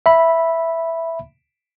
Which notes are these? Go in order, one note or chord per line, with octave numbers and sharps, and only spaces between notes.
E5 B5